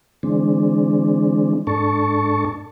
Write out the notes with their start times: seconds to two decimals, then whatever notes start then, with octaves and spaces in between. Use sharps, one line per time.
0.23 D3 E3 G#3 C4 D4
1.67 G#2 D4 A4 A5 C#6